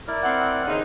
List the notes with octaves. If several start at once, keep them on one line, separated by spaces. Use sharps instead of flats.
E4 A#4 D5
C4 F#5
D#2 C#3 D#4 C5